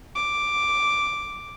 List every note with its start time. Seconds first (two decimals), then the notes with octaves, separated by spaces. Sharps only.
0.15 D6